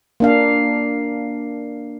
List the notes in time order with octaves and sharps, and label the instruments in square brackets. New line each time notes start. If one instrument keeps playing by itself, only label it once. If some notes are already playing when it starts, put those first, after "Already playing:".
[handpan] A#3 D4 F5